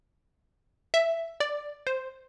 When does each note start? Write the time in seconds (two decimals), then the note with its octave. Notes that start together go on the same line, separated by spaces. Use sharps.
0.94 E5
1.40 D5
1.87 C5